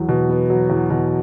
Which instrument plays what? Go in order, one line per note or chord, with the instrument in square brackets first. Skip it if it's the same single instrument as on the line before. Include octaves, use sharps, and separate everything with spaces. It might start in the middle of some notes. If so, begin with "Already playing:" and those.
Already playing: [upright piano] E2 F#3
B2
B3
F#3
E2
B2